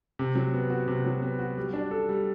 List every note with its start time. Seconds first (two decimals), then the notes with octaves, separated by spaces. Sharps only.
0.19 C3
0.35 F#3
0.54 B3
0.70 F#4
0.88 C3
1.05 F#3
1.22 B3
1.39 F#4
1.57 G3
1.73 D4
1.91 A4
2.09 G3